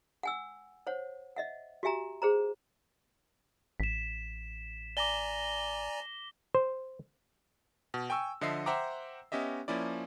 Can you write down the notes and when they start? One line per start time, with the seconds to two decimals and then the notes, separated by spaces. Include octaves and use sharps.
0.23 F#5 G#5 E6
0.87 C5 C#5 F#5
1.37 D#5 E5 F#5
1.83 F#4 G4 E5 G#5 A#5
2.22 G#4 C5 A#5
3.80 A1 B6 E7
4.97 D5 G#5 A#5 D6 A#6 G7
6.55 C5
7.94 B2
8.10 G5 G#5 C#6 E6
8.41 D3 F3 D#5 E5 C7
8.66 C5 E5 F#5 G5 A#5 D6
9.32 B3 C#4 G4 D#5 E5
9.68 F3 A#3 C#4 E4 D5